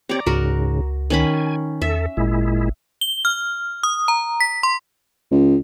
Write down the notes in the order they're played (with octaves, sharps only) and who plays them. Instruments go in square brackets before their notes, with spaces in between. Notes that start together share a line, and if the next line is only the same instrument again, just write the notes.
[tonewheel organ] C4 G4 C#5 [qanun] D5 A#5
[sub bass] C#2 [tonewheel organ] G#2 C#3 [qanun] F#4 A#4
[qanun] D#3 C#4 B5 [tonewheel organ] G#5
[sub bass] E2 [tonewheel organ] A4 [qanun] E5
[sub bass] G#1 [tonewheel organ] A#2 G#3 E4
[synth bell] G7
F6
D#6
A#5
B6
C6
[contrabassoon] C#2